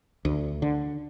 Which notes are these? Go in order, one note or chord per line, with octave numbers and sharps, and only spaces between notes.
D2
D3